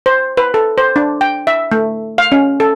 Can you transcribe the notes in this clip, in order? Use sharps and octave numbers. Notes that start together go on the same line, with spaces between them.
C5
B4
A4
C5
D4
G5
E5
A3
F5
C#4
A4